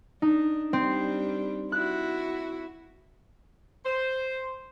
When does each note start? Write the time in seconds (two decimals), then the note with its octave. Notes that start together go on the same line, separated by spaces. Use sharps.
0.22 D4 D#4
0.73 G3 C4 D4
1.72 E4 F#4 F#6
3.85 C5